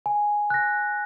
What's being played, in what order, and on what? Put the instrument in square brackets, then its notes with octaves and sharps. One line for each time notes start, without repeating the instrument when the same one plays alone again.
[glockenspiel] G#5
F#6 A#6